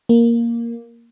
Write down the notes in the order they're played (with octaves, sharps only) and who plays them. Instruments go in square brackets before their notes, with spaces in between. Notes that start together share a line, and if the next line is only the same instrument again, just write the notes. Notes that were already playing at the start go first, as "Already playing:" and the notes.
[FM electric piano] A#3